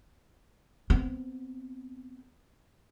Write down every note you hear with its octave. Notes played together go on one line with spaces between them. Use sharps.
B3 C4